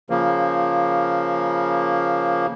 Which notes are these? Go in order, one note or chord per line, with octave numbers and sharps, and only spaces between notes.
C#3 F3 A#3